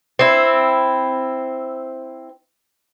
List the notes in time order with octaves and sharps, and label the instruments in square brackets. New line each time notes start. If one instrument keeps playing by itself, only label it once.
[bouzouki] C4 E4